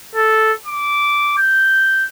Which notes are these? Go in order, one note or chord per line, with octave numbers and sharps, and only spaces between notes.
A4
D6
G6